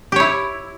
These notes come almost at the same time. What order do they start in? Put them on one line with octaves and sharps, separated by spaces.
G4 C#5 E4